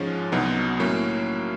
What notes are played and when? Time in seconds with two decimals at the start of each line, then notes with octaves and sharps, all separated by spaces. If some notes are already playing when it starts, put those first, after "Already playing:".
Already playing: G#2 F3 G#3 C#4
0.32 C2 B2 F#3 B3 D#4
0.80 A2 F#3 A#3 C#4